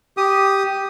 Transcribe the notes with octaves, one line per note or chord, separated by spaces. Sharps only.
G4 D#6